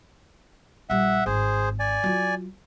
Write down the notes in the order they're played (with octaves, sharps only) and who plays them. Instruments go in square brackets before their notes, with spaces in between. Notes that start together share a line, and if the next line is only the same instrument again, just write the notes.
[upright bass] A#1 G3 [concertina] E5 F#5
[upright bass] G#1 [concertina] G#4 C5
[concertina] D5 G#5
[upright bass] F#3 F4